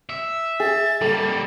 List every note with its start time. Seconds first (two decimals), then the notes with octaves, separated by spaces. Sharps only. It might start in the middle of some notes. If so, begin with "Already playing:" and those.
0.10 E5
0.60 G#4 A6
1.01 G3 A#3 A4